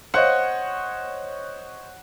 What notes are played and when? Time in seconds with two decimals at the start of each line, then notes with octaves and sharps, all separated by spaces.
0.14 C5 C#5 D#5 F#5